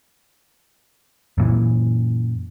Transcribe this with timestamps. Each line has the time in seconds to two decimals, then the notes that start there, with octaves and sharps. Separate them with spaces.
1.38 F#2 A#2 E3